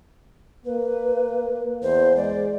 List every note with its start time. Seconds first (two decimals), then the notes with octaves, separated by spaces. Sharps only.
0.65 A#3 B4
1.83 E2 C5
2.16 G#3 D5